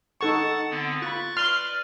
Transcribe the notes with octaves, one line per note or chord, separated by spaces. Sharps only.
D#4 A4 F#5 A5 C#6 A6
D3 B3 C4
F4 B5 C#6 F#6 A6
B4 D5 C6 F6